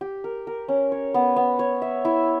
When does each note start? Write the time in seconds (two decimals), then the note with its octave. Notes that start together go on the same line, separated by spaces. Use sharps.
0.01 G4
0.24 A#4
0.47 A#4
0.68 C#4
0.92 C#5
1.14 B3
1.36 B3
1.59 C#5
1.82 E5
2.05 E4